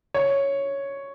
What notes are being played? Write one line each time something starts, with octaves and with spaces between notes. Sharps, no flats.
C#5